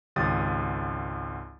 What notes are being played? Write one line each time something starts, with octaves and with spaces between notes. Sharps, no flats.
G#1 C#2 G4 D#6 A6